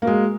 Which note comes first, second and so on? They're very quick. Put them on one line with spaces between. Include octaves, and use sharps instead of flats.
A#3 F#4 G#3